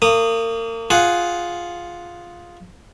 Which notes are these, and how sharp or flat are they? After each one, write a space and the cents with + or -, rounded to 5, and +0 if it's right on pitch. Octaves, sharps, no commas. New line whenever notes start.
A#3 -35 D#6 -15
F4 +0 G#4 +0 F#5 +0